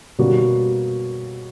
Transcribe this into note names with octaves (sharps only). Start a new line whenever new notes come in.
B2 G3 A#3 C#4 F#4